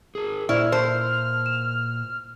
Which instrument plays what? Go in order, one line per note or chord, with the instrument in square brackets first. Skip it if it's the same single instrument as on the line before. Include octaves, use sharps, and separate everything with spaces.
[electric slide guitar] G#4 A#4
[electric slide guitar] A#2 [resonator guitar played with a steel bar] E4 [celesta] C5 D5 C#6 [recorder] F6
[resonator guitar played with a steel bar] C5 [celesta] A5
[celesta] E7